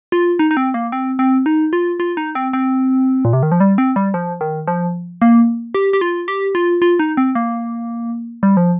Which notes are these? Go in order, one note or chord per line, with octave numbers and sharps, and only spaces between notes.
F4
D#4
D#4
C4
A#3
C4
C4
D#4
F4
F4
D#4
C4
C4
A#2
C3
D#3
F3
G3
C4
G3
F3
D#3
F3
A#3
G4
G4
F4
G4
F4
F4
D#4
C4
A#3
G3
F3